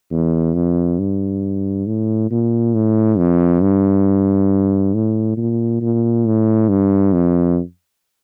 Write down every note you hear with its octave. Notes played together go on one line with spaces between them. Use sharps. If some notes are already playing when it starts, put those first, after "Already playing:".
E2
F2
G2
A2
A#2
A2
F2
G2
A2
A#2
A#2
A2
G2
F2